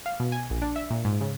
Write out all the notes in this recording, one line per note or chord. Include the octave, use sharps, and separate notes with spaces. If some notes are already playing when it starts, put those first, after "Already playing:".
F5
B2
G#5
A#1
D4
E5
A#2
G#2
C#3